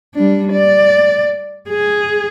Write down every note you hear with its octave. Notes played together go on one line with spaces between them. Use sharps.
G3 D4
D5
G#4